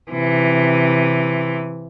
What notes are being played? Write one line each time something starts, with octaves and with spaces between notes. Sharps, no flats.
C3 E3